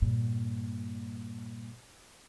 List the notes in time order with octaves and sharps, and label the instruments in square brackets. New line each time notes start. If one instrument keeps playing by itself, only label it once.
[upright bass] G2 A#2